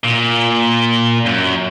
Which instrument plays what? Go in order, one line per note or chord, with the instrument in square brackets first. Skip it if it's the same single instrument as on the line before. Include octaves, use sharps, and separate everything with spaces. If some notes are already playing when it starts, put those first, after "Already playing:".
[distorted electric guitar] A#2
F#2